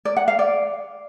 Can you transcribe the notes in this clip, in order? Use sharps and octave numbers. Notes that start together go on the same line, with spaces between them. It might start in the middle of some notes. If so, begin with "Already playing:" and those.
D5
F#5
F5
D5